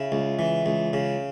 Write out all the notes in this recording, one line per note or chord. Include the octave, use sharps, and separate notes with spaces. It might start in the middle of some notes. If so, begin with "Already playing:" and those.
Already playing: C#3 E4
C#2
E3
C#2
C#3